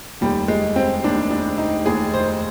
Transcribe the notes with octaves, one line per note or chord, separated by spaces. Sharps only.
F1 D#2 D#3 G3
G#3
C4
F1 D#2 D#3 D4
D4
D#4
F1 D#2 D#3 G#4
C5